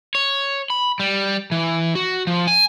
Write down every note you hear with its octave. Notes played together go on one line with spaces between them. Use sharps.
C#5
B5
G3
E3
F#4
F3
G#5